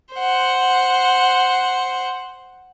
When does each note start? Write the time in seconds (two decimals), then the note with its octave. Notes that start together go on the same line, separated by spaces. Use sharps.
0.15 C5 F#5